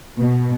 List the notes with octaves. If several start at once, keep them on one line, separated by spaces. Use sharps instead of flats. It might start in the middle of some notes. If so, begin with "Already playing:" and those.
B2